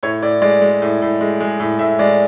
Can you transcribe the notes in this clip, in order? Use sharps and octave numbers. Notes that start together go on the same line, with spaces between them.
A2 C#5
A2 D5
G#3 D5
G#3
A2
A2
G#3
G#3
A2
A2 E5
G#3 D5